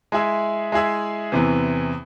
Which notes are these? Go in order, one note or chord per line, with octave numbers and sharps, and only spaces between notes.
G#3 E4 G#4 E5
G#3 E4 G#4 E5
E2 C3 E3